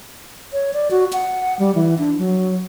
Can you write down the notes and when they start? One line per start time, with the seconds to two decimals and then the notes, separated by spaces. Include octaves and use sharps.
0.53 C#5
0.73 D5
0.91 F#4
1.13 F#5
1.59 G3
1.75 E3
1.98 D4
2.18 F#3